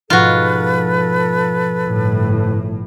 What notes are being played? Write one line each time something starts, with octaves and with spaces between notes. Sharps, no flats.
G#2 B2 F3 F4 F#4 A4 B4
G1 A2